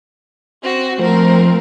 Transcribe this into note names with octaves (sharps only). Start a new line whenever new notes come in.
C4 F#4
F3 A3 C4 A#4